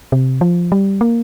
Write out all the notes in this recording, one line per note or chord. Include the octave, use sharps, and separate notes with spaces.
C3
F3
G3
A#3